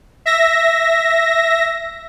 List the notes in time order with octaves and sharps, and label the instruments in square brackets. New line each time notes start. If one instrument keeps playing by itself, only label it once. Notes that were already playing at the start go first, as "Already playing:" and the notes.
[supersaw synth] E5 A#6